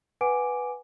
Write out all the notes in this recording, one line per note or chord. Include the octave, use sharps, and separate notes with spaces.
B4 F#5 G#5 D6 D7